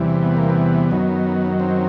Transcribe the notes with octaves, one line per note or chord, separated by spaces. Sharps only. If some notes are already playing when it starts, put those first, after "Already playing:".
Already playing: E2 C3 E3 G3
B3
A#3
B3
F#2 D#3 F#3
C4